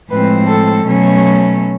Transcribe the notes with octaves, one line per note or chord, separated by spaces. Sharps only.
A2 F3 G#3 C4 B4
A4
B2 F#3 A3 C#4